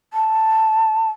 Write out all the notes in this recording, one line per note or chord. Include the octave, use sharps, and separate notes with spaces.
A5